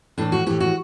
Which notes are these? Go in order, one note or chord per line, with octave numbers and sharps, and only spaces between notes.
A2 E3 D4
F#4
A2 E3 G4
F#4